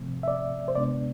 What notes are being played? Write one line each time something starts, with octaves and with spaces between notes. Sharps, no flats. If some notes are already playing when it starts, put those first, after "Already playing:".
Already playing: C3 F3 A3 C4
E5
D5
C5
C3 G#3 B3 D4 D5